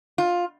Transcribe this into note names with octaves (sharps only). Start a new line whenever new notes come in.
F4